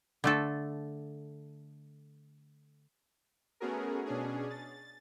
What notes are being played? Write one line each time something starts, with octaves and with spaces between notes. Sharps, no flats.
D3 A3 A4
A3 B3 C#4 F#4 G#4 A#4
B2 C#4 D4 G#4
A6